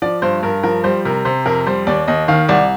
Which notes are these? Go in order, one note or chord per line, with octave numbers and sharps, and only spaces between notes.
F3 D5
G2 C5
G2 A#4
F3 A#4
G3 C5
C3 A#4
C3 C5
F2 A#4
G3 C5
D#2 D5
D#2 D#5
D#3 F5
C2 D5